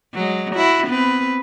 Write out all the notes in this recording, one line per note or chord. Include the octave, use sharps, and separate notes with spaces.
F#3 G#3
E4 F#4
B3 C4 B4